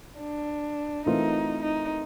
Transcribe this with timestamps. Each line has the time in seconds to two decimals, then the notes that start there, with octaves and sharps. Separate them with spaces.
0.20 D4
1.06 E3 A3 C4 D#4 F4 A#4
1.63 D#4